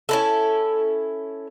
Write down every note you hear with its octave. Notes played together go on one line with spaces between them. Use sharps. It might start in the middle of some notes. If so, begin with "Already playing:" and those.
C#4 E4 A4